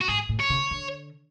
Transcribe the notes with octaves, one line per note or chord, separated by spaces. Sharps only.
F#4
G#2 G#4
A2
C#5
C#3
D3